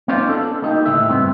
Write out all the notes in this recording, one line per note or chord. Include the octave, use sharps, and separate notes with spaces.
B3 C#4 D#4 F4 C5 D5
D4 A4
A#3 D#4 G4
C#2 A2 D3 G#3 E5
D2 G2 B3 C4